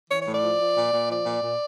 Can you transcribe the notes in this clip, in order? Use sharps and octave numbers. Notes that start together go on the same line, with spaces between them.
E3 C#5
C#5
A2
D5
F3
F3
A#2
A#2
F3 D5
A#2
A#2